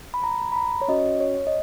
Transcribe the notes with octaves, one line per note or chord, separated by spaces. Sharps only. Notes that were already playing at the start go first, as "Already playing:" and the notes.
B5
A#5
B5
A#5
C#5
C#4 F#4 D#5
C#5
D#5